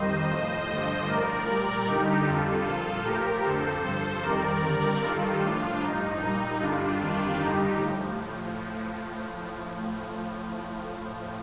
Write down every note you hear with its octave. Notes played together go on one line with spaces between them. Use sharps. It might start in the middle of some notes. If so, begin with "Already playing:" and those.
Already playing: F2 D#3 G3 C5 D#5
A2 F3
G2 D3 F3 C5 D#5
A2 F3 A#4 D5
A#2 G3
G2 D3 G3 D#4 G4
F2 D3 G3 F4 A4
A#2 F3
A2 F3 G4 A#4
F2 D3 F3 A4 C5
G2 F3
F2 D#3 G3 A#4 D5
F2 D3 G3
G2 D#3 G3 F4 A4
A2 F3 D4 F4
G2 F3 D#4
A#2 G3 D#4
G2 D3 G3 D4 F4
F2 D#3 G3
G2 D3 G3 D#4 G4
A2 F3